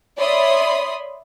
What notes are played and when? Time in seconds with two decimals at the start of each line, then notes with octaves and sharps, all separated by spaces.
0.17 C#5 D5 E5 B5 C6 D#6